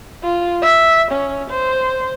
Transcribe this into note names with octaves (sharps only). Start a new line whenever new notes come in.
F4
E5
C#4
C5